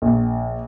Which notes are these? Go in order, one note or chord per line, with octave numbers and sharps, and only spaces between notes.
A#1